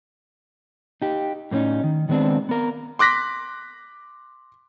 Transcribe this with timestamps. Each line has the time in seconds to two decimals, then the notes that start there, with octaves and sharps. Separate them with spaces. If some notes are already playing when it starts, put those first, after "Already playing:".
1.02 D#4 G4
1.51 A2 A#3 C4 C#4 D#4
1.84 D#3
2.09 D#3 G#3 B3 C4 D4
2.49 B3 A#4
2.99 C6 D6 F#6 A#6 B6